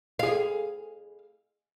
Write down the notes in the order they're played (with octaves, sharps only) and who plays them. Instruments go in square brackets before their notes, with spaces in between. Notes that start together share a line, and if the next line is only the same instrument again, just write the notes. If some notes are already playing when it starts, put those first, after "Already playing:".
[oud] G#4 F5